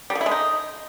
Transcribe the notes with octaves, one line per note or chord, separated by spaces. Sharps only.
G3
F3
E4
G#3
D#4